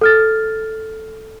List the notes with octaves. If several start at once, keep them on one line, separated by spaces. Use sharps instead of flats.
A4 F6 A6